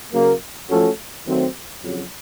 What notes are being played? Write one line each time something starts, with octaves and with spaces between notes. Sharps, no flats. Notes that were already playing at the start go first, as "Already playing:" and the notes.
C#3 F#3 A#3
F3 A3 C#4 F#4 A4
D#3 F#3 A3 C4
F2 C#3 F#3